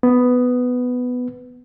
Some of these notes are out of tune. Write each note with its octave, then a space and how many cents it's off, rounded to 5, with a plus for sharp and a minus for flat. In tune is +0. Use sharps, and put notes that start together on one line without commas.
B3 +10